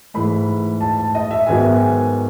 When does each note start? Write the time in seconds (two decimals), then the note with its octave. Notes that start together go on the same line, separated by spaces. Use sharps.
0.14 G#2 E3 A3 B5
0.81 A5
0.97 A5
1.15 D#5
1.31 E5
1.46 G#2 D#3 F#3 B3 G#5